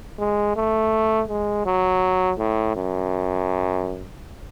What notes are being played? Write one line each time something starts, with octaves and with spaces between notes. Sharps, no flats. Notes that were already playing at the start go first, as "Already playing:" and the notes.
G#3
A3
G#3
F#3
A2
F#2